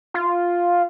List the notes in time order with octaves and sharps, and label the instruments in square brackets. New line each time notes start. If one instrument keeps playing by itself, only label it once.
[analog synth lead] F4